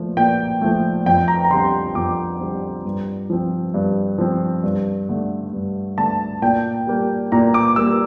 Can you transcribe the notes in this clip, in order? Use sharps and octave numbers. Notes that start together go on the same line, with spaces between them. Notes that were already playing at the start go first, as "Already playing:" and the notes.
Already playing: A#2 F3 A3
A#2 G5
F3 A3
F2 G5
A#5
A#5
D3 G3 C4 C6
F2 D6
D3 G3 C4
G2
F3 C4
G2
F3 C4
G2
D3 A3
G2
D3 A3 A5
A#2 G5
G3 A#3
A#2 A#5
D6
G3 A#3 E6